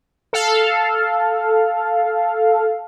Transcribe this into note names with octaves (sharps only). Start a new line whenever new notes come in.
A4 F5